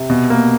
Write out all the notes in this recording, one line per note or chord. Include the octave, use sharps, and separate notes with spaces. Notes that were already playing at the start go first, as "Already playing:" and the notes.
Already playing: C3
B2
A#3